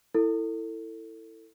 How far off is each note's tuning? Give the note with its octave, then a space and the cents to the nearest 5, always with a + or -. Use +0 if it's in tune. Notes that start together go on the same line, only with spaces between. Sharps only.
E4 +0 A4 +25